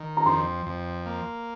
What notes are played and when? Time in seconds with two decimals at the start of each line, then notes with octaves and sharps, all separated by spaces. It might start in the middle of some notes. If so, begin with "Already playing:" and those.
Already playing: D#3
0.17 A#5
0.26 F2 C6
0.66 F2
1.06 A#3